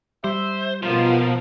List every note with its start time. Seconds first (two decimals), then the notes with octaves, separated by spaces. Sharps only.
0.24 G3 C5 E5
0.83 B2 F3 B3 F4 A#4